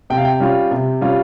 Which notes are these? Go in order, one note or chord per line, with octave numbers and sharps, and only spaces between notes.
C3 G5
F5
G5
G3 C#4 F4
C3
G3 C#4 F4